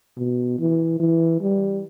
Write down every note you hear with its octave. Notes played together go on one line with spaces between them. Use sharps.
B2
E3
E3
G3